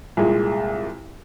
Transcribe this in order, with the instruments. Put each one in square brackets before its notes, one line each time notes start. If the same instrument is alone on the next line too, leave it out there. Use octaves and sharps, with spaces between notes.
[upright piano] C2 A#2 G#3